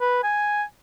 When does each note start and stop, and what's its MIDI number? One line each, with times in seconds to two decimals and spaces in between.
0.01 0.19 71
0.24 0.63 80